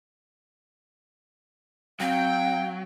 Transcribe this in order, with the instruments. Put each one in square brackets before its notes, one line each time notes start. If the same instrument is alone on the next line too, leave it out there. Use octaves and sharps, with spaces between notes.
[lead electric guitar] F#3 [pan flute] C4 [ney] F5 [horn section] G5